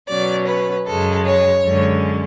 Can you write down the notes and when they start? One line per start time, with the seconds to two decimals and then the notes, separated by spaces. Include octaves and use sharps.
0.08 B2 F#3 C#4 D5
0.47 B4
0.86 F#2 C#3 G#3 A4
1.25 C#5
1.64 F#2 D3 G#3 C#4